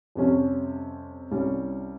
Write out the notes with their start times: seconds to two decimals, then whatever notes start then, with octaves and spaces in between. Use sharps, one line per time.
0.15 F2 C3 G3 C#4 G4
1.31 C2 C3 G3 C#4